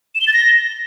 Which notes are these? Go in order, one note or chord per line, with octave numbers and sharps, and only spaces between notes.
E7
G7
A6
A#6